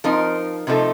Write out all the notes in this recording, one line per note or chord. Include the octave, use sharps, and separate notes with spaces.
F3 C4 D#4 A#4
C3 F3 A3 D#4 A4